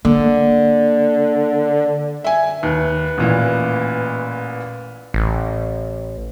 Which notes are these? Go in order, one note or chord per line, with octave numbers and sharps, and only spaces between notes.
D3 A#3
E5 G#5
D#2 B4
A1 A#2 E3
A1